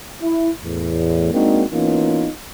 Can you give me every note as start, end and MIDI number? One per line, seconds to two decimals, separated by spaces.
0.22 0.49 64
0.64 1.30 40
0.64 1.30 45
1.33 1.64 56
1.33 1.64 58
1.33 1.64 60
1.33 1.64 62
1.33 1.64 63
1.33 1.64 66
1.71 2.29 52
1.71 2.29 58
1.71 2.29 59
1.71 2.29 61
1.71 2.29 63
1.71 2.29 65